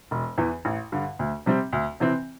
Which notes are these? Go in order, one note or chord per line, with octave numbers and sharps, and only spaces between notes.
E1
E2 E3
A1
G2 D3
D2
C3 G3 C4
D2
C3 E3 C4